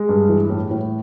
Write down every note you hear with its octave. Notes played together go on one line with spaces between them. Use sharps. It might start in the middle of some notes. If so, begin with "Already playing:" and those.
Already playing: G#3
G2
E3
A2
A2